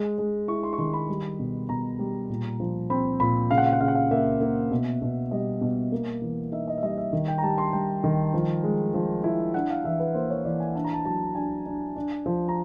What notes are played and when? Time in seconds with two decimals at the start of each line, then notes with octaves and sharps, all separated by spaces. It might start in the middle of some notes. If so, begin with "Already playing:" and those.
Already playing: G#3
0.18 G#3
0.48 E4 C#6
0.63 C6
0.73 C#6
0.78 D#3 C6
0.93 B5
1.09 G3
1.39 B2
1.69 B2 A#5
1.99 G3
2.29 A#2
2.60 F3
2.90 C4 B5
3.20 A#2 B5
3.50 C#3 F5
3.58 F#5
3.66 F5
3.73 F#5
3.81 C#3 F5
3.88 F#5
3.95 F5
4.11 A#3 E5
4.41 A#3
4.71 B2
5.02 B2
5.31 G3 D#5
5.61 B2
5.92 A#3
6.22 E3
6.52 D#4 E5
6.68 D#5
6.78 E5
6.82 G3 D#5
6.97 E5
7.13 D#3
7.28 G5
7.38 A#5
7.43 G3 A5
7.58 C6
7.73 G3 G5
8.04 D#3
8.34 F3
8.64 G#3
8.94 F3
9.24 E4
9.54 D4 F#5
9.70 F5
9.84 E3 E5
10.00 B4
10.14 A#3 C5
10.30 C#5
10.44 E3 D5
10.60 G#5
10.75 D4 A5
10.84 A#5
10.93 A5
11.05 F#3 A5
11.35 D4 G#5
11.66 D4
11.96 D4
12.26 F3
12.48 A#5